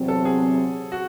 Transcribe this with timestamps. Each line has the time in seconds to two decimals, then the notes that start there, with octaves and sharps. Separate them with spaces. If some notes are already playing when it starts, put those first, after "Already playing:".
Already playing: E2 C3 F#3 C4
0.08 A4
0.25 G#4
0.92 F#4